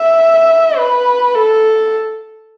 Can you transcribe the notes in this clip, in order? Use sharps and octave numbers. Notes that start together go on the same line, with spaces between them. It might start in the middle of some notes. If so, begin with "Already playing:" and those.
Already playing: E5
B4
A4